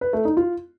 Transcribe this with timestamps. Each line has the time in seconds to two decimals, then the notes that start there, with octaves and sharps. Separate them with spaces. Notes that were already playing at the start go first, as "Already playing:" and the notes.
0.01 B4
0.13 A3
0.25 D#4
0.37 F4